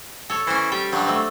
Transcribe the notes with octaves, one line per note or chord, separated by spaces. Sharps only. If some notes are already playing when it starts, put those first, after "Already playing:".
A4 C#5
E3 C#4 C5
G3 G5
G2 F#3 D4
A3 C4